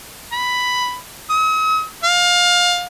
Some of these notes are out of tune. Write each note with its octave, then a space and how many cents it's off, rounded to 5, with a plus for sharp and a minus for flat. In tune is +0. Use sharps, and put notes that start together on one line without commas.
B5 +5
D#6 +45
F5 +25